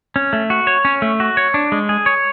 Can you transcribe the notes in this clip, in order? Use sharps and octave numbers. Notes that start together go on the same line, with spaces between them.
C#4
A3
F#4
C#5
C#4
A3
F#4
C#5
D4
G#3
G#4
C#5